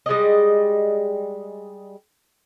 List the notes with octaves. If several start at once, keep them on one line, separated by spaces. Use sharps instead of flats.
G3 G#3 G#4 D#5